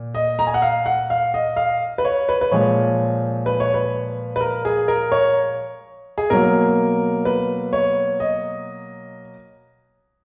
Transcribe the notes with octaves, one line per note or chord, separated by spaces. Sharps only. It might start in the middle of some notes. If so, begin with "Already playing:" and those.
Already playing: A#2
D#5
A#5
G#5
F#5
F5
F#5
F5
D#5
F5
B4
C#5
B4
B4
A#2 F3 G#3 C#5
B4
C#5
B4
B4
A#4
G#4
A#4
C#5
G#4
B2 F#3 A#3 A#4
B4
C#5
D#5